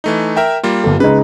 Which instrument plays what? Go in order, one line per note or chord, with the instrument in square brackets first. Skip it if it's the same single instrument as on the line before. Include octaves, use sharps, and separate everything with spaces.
[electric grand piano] E3 A3 D#4
A#4 E5 G5
G3 A#3 F4
[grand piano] G1 A4
[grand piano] C#3 G#3 D#4 [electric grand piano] B4